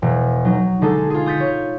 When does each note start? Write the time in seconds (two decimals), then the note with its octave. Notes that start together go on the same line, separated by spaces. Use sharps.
0.02 E1
0.45 F#3 D#4
0.81 D3 G#3 D#4 G#4 A4
1.10 F4 G#4
1.26 D#6 G6 A6 B6 C#7
1.40 C#5